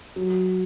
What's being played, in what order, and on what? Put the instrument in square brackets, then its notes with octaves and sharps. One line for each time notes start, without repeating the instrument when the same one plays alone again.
[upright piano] F#3